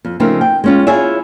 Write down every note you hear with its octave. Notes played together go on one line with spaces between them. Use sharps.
F2
C#3 F3 A3 C4 D#4 A#4
G5
G#3 C#4 F4
E4 F4 G#4 C#5 E5